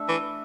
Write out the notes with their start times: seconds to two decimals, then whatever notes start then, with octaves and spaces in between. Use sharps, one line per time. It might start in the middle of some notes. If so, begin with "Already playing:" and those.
Already playing: A3 D4 A4 E5
0.09 E3